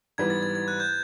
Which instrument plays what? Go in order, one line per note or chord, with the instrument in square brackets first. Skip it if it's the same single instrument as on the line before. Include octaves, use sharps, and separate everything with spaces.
[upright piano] G#2 E3 G3 B3 [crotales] G#6
[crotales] A6
G#6
G#6
F#6
G6